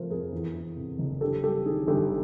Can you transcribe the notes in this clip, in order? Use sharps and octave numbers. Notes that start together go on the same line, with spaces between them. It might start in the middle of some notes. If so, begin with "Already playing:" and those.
Already playing: C3 F3 A3 A#4 C5
F2 G#4 A#4
E2
E3
C3
F#1
G2 G4 A4
G3 G4 A4
D#3 G#4
G1 G4 A4